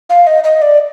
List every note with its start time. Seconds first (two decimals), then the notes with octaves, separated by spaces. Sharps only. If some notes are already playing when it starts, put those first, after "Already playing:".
0.10 F5
0.27 D#5
0.44 D#5
0.62 D5